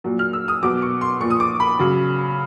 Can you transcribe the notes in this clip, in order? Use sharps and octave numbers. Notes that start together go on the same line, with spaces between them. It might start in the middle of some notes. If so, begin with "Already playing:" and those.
A#2 F#3
F6
E6
D#6
B2 F#3 D6
C#6
C6
A#2 F3 C#6
D#6
D6
B5
C#3 F#3